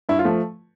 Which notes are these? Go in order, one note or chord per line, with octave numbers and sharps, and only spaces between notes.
G2 E4
F4
F3 A3